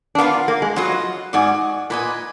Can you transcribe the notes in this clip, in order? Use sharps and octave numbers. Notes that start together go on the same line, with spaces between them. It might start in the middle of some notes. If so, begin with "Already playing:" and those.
D4
B3 F4 A#4 F5
A#3
G#3
F#3 F4 B4 D#5
G#2 F#4 D5 G#5 D#6
A#2 B4 D#5 G#5